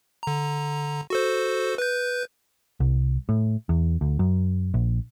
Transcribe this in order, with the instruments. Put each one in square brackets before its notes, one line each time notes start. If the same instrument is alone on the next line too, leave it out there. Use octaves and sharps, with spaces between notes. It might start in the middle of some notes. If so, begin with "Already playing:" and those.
[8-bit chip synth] D3 A#5
F#4 A4 C5
B4 G6
[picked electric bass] C2
A2
E2
D2
F#2
A#1